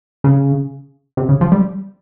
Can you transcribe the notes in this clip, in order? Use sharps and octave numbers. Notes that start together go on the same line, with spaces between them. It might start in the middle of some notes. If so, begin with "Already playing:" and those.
C#3
C3
C#3
F3
G3